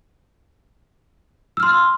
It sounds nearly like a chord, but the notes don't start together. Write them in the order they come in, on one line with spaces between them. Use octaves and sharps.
E6 F6 C6